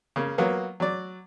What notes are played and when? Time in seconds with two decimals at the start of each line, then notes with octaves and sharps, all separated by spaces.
0.16 C#3 A#3
0.38 F#3 A#3 B3 F4
0.80 F#3 D5